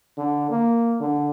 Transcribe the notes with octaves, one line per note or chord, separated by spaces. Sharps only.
D3
A#3
D3